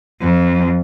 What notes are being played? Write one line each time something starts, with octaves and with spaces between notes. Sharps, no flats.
F2